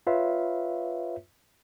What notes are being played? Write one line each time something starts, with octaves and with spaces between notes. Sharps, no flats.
F4 B4 C#5 E5 F5